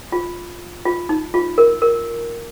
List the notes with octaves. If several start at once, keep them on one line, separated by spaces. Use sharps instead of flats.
F4
F4
D#4
F4
A#4
A#4